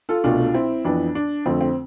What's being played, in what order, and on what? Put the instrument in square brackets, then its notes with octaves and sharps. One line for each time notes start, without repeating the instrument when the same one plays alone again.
[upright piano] F4 A4
C2 B2 A3 D4 F4
C4 E4
F2 E3 B3 D4
D4
F2 D3 A3 C4
C4